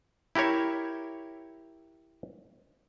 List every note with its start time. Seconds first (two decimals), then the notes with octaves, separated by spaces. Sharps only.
0.35 E4 G4 A#4 C#5 E5